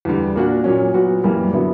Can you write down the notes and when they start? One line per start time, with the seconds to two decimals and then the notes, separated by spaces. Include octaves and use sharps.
0.05 E2 D3 G3
0.35 A#2 A#3 D4 F#4
0.64 A#2 F#3 C#4
0.94 A#2 F#3 B3 F#4
1.24 F#2 E3 G3 A#3
1.53 D3 F#3 B3 E4